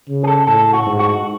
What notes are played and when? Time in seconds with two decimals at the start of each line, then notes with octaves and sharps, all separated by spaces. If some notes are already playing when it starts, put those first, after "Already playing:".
0.09 C#3
0.23 G#4
0.28 A4
0.47 A2 A4
0.73 F#4
0.86 G#2
0.99 F#4